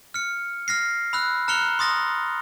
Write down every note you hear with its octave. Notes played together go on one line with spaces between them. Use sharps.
F6 C#7
F6 A#6 C7
B5 E6 F#6
A#5 F6 F#6 C#7 F7 G7
C6 D#6 A6 A#6